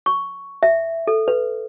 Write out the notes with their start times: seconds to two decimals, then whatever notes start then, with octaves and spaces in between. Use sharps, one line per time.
0.06 C#6
0.63 E5
1.07 A4
1.28 B4